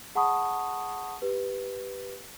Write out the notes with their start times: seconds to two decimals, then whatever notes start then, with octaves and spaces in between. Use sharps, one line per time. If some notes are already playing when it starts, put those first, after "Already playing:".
0.15 G#4 F#5 A5 B5 C#6 D#6
1.22 G4 B4